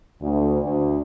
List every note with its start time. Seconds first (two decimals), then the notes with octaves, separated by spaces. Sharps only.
0.21 D2
0.63 D2